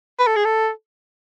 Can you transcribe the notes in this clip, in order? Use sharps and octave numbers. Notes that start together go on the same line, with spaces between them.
B4
A4
G#4
A4